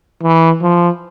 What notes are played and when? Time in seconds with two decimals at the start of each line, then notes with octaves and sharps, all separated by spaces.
0.23 E3
0.62 F3